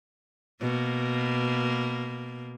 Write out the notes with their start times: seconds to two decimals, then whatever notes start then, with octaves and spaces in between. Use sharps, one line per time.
0.61 B2 A#3